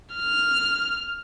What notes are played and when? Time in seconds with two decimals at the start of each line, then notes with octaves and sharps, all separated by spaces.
0.15 F6